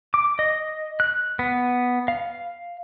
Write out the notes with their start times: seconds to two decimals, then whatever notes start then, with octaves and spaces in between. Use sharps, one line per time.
0.14 D6
0.39 D#5
1.00 F#6
1.39 B3
2.08 F5